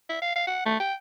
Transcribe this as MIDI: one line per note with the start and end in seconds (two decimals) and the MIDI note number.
0.09 0.19 76
0.22 0.34 77
0.35 0.45 77
0.47 0.61 78
0.65 0.79 57
0.79 0.94 79